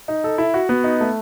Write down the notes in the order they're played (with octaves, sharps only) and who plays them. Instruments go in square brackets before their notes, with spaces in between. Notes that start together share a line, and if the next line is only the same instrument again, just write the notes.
[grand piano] D#4
A4
E4
F#4
B3
D#4
A3